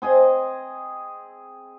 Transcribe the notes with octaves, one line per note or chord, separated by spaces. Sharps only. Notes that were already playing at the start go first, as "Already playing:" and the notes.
C4 G#4 D#5 G#5